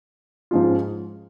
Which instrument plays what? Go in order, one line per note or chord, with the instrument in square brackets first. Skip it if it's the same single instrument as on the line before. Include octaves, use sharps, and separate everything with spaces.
[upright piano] G#2 F3 G#3 C#4 F4